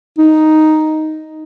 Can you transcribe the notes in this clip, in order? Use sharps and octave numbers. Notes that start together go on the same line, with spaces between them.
D#4